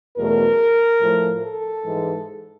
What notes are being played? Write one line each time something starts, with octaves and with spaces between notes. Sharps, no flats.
E2 B2 F#3 A3 A#4
A2 F3 A3
A4
G#2 E3 G#3